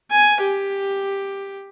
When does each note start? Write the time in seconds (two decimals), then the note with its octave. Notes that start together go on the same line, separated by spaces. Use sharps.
0.11 G#5
0.41 G4